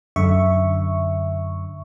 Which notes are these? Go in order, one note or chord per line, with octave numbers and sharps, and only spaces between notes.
F#2 D3 E5 C#6